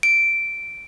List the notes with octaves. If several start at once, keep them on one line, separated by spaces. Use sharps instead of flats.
D7